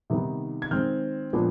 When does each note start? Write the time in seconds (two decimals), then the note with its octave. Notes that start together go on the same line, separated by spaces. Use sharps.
0.10 C3 D#3 G3 B3 D#4
0.62 G#6
0.71 D#3 G#3 C4 F6 G6
1.33 A#2 F3 G#3 B3 D4